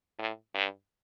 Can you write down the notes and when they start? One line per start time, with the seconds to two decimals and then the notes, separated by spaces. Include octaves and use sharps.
0.18 A2
0.54 G2